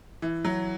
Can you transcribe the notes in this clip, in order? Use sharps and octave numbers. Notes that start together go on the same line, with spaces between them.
E3
F#3